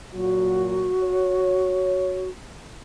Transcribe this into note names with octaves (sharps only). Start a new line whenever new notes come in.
A#2 F#3 F#4
C#5